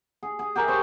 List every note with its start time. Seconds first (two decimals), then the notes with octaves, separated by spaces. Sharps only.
0.23 G#4
0.39 G#4
0.55 G4 G#4 A#4 E5
0.68 C5 C#5 A5 C6